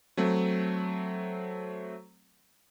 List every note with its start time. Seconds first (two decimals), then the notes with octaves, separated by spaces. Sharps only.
0.17 F#3 A3 C4